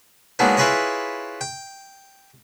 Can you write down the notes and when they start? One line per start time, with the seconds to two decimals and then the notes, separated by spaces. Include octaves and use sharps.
0.39 F#3 G#3 A#3 B3 D4 D#4
0.57 E4 F4 G#4 B4 C#5 D#5
1.41 G5